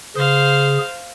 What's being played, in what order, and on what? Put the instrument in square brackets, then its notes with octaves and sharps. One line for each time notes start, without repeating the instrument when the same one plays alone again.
[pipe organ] C#3 G#4 [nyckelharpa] C5 F5